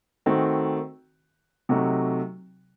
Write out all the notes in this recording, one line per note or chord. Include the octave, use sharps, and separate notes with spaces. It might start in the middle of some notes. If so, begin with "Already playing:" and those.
D#3 A3 C4 D#4 F#4
C3 F#3 A3 D#4 F#4